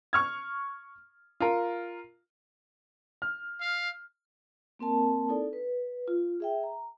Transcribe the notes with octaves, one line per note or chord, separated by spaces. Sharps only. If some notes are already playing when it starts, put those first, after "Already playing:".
C#6 F6 G#6
F4 A#4
F6
F5
A#3 C4 A#4 A5
D#4 E4 A4 D5
B4
F4
G#4 E5 G5
A#5